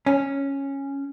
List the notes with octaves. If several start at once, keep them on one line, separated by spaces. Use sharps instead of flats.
C#4